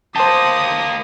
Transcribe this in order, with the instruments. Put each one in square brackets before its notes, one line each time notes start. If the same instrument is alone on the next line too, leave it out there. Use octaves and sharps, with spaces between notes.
[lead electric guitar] A#3 G4 [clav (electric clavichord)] C5 A5 [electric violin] D#6